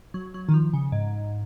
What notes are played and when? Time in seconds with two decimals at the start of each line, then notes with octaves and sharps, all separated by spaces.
0.14 F#3
0.34 F#3
0.49 D#3
0.54 F3
0.73 C#3
0.92 G#2